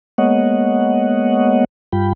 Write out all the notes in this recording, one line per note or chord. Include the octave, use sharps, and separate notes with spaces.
G#3 A#3 B3 C#5 D#5 F#5
G2 G3 F4 G5 B5